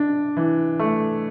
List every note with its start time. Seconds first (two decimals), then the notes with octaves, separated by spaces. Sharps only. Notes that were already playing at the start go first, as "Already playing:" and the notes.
Already playing: D4
0.37 E3
0.79 A3